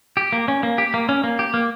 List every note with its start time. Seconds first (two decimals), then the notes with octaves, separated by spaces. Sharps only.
0.17 G4
0.32 A#3
0.48 C#4
0.63 A#3
0.78 G4
0.94 A#3
1.09 C#4
1.24 A#3
1.39 G4
1.54 A#3